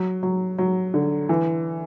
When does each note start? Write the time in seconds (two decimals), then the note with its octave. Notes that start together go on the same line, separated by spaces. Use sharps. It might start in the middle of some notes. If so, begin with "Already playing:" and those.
Already playing: F#3
0.23 F#3
0.58 F#3
0.94 D3
1.29 E3